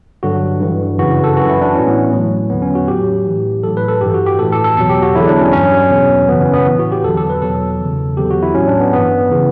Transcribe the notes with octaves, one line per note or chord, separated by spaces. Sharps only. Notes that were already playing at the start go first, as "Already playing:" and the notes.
G2 D3 F#3 F#4
G2 E3
F#2 C#3 E3 F#4
A4
F#2 E3 F#4
E4
D4
A2 E3 C#4
B3
A2 F#3
E2 D3 F#3 B3
C#4
F#4
A2 F#3 G4
A2 E3
A2 F#3 A4
B4
A4
G2 E3 G4
F#4
G4
A2 E3 A4
A4
A4
E2 B2 F#3 A4
G4
F#4
E2 D3 F#3 E4
D4
C#4
G2 F#3 C#4
E2 B2 F#3
F#2 C#3 E3 B3
C#4
B3
A2 E3
F#4
G4
E2 D3 F#3 A4
A4
B4
E2 B2 F#3 A4
E2 C#3 E3
E2 D3 F#3 G4
F#4
E4
A2 F#3 C#4
D4
B3
G2 E3 B3
C#3 E3